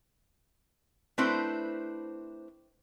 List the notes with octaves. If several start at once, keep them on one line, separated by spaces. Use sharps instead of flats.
A3 C4 D4 E4 B4 C5